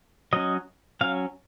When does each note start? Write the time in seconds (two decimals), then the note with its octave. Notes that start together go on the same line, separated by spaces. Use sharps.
0.33 F#3 C#4 D#5
1.01 F#3 C#4 F5